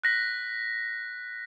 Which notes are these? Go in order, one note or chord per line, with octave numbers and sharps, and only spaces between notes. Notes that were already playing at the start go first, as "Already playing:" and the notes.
F#6 A#6 B6